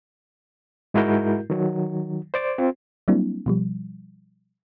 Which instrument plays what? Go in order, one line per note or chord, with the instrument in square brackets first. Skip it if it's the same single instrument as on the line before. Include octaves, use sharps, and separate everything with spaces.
[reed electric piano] G#2 G#3 E4 F#4 A#4 G6
D#3 F#3
C5 D5 D6
C4 F4
[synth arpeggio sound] F#3 G3 A#3 C4 D4 E4
B2 F3 G3